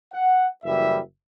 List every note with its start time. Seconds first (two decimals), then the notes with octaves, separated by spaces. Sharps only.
0.12 F#5
0.63 F#1 F#2 E3 G3 E5